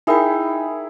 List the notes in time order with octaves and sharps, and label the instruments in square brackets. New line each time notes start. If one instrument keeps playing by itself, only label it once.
[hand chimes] D#4 A#4 G5 [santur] E4 G#4 A#5